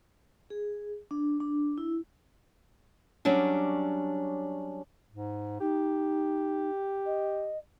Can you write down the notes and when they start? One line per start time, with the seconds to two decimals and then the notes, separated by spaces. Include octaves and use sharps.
0.50 G#4
1.11 D4
1.40 D4
1.78 E4
3.25 F#3 G3 C#4 D4
5.10 G#2
5.61 D#4 G4
7.05 D#5